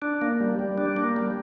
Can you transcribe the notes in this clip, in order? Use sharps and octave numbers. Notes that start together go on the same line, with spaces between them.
D4
A#3
G3
G3
D4
A#3
G3